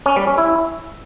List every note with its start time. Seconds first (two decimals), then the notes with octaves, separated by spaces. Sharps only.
0.06 C#4
0.16 G3
0.27 C#4
0.38 E4